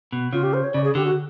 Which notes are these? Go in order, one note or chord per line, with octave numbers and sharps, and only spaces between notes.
B2
C#3 F4
G4
C5
C#5
C#3 D5
G#4
D3 G4
F#4